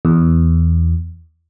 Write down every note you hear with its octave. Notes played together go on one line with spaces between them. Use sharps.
E2